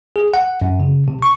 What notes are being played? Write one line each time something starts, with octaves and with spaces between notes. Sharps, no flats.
G#4
F#5
F#2
C#3
C3
C#6